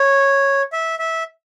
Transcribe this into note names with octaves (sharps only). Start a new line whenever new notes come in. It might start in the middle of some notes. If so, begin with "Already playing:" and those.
Already playing: C#5
E5
E5